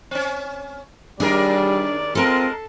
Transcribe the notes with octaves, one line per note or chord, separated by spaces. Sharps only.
C4 C#4
D#2 G3 D4 G#4 A#4 D5
G#3 C4 F4 A4 A#4 A5